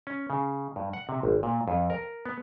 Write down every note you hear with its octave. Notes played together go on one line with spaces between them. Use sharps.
C#4
C#3
G2
F#5
C3
G#1
A#2
F2
A#4
B3